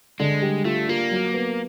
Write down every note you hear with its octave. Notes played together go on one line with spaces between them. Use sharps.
D3 G#3
G3
A3 F4
A#3 F4
F#3
B3